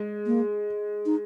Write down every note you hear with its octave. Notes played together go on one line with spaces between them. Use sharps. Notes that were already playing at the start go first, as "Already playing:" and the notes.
Already playing: G#3
A#3
D#4